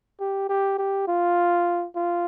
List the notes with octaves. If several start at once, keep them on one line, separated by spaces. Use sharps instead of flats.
G4
G4
G4
F4
F4